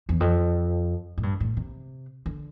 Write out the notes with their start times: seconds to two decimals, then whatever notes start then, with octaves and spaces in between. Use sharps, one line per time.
0.09 E2
0.20 F2
1.18 A2
1.23 G2
1.40 A2
1.57 C3
2.26 D3